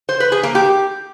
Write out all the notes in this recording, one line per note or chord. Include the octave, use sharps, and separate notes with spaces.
C5
B4
G#4
A#3
G4